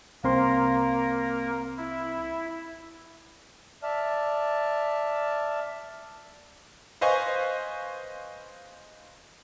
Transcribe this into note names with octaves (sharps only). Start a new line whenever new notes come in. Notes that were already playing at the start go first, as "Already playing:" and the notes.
C2 A#3 C4 A#4 C6
E4
D5 E5 A5 F6
B4 C5 D#5 F5 G#5 C#6